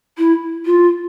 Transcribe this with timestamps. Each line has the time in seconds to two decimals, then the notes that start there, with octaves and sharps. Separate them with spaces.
0.18 E4
0.66 F4